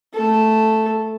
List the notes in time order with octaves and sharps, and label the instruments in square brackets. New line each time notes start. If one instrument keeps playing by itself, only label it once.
[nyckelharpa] A3 A4